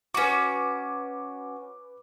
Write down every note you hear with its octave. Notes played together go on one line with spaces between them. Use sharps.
C#4 F#4 B4 D6